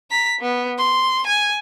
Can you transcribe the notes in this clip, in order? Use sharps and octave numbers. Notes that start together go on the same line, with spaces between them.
A#5 B6
B3
C6
G#5